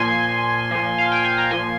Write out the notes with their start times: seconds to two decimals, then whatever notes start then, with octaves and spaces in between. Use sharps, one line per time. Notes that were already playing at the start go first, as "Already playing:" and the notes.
Already playing: A#2 F3 G#5 C6
0.71 A#2 F3
0.98 F5
1.12 G5
1.25 G#5
1.38 A#5
1.51 A#2 F3 G#5 C6